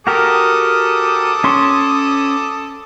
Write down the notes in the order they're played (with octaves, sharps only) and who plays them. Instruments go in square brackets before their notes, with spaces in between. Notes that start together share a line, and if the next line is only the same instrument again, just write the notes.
[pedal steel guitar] F#4 G4 A#4 [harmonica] A4 D6 D#6
[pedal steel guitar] C#4 C6 C#6